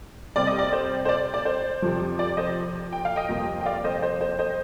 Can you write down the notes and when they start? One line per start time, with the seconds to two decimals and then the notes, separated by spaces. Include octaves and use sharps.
0.36 C3 G3 C4 D5
0.47 D#5
0.59 D5
0.73 C5
1.05 C5
1.09 D5
1.34 D5
1.45 C5
1.82 F2 C3 F3
2.19 D5
2.37 C5 D#5
2.93 G5
3.05 F5
3.16 D#5 G5
3.29 F2 C3 G3 A#3
3.61 G5
3.66 D5 F5
3.84 C5 D#5
4.02 C5
4.21 C5
4.39 C5 D#5